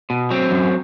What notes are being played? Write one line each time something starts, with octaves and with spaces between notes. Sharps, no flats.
B2
F#3 C4
F#2